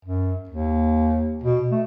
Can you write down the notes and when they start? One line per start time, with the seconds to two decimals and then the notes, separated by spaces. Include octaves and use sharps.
0.05 F#2
0.49 D#2
1.43 B2
1.71 A3